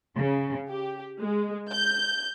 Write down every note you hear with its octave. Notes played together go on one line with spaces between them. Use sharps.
C#3
G4
G#3
G6